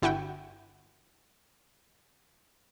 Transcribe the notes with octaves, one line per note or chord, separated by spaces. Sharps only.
G1 E4 F#4 G5